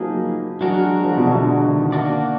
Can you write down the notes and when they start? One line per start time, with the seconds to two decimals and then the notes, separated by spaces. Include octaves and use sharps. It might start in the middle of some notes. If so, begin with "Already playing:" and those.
Already playing: F3 F#3 A#3 D#4 G#4 B4
0.61 F#3 G#3 D4 F#4 A#4
0.84 F#3
1.05 F3
1.17 B2
1.27 D3
1.60 D3
1.76 D#3
1.92 D3 A#3 D4 F#4 D5